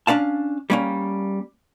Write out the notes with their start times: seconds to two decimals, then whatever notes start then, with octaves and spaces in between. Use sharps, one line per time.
0.07 C#4 D4 F5 A5
0.70 G3 A#3 C#4